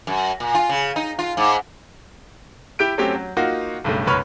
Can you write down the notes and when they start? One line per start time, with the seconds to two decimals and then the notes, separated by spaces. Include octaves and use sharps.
0.07 F#2
0.40 A#2
0.55 F4
0.69 C#3
0.96 D#4
1.19 F4
1.37 G#2
2.79 E4 G4 G6 D7
2.98 F#3 A3 C4 C#4 G4
3.15 F#3
3.37 A#3 D#4 F4 F#4
3.84 B1 G2 C#3 A3
4.07 C#2 F#2 B4 C#5 C#6 F6